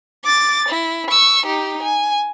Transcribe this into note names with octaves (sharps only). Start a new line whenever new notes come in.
D6 A6
E4
C#6 E6
D#4 G4
G#5